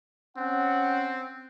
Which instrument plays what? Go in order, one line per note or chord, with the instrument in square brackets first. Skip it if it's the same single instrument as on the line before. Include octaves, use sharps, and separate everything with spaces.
[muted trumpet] C4 [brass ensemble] C#4 F#5